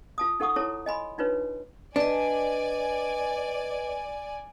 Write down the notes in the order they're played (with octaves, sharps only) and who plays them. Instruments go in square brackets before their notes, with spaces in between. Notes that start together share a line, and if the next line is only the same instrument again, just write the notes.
[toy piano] F4 A5 D#6
D#4 A4 F#5 C#6 D#6
E4 A4 C#5 A5 A#5 D6
D#5 G#5 B5 C6
D4 D#4 F4 B4 C#5
[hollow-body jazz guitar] D4 [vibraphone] B4 D#5 [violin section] D5 G#5